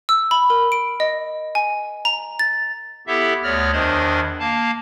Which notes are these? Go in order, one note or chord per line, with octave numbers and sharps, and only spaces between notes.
E6
B5
A#4
D7
D#5
G#5
A#5
A6
B3 E4 G4 A4 E5
D2 B3 C#5 D5 F6 A#6
E2 D#3 D4 C5 D#5 G#6
A#3 F5 A5